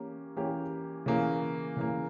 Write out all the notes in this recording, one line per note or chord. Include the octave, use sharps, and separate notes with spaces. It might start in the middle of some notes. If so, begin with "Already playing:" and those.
Already playing: E3 A#3 C#4 G4
E3 A#3 C#4 G4
C#3 E3 A#3
C#3 E3 A#3